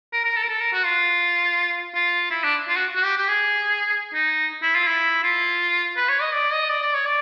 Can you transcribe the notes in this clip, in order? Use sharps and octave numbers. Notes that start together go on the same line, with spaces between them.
A#4
A#4
A4
A#4
A4
A#4
F#4
F4
F4
E4
D4
F4
F#4
F#4
G4
G4
G#4
D#4
E4
F4
E4
F4
B4
C#5
D#5
D5
D#5
D5
D5
C#5
D5